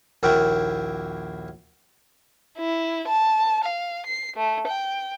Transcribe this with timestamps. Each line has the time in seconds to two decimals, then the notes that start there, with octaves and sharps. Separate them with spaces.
0.23 A#1 D#2 E4 F#4 A#4 G5
2.59 E4
3.08 A5
3.64 F5
4.06 C7
4.37 A3
4.67 G5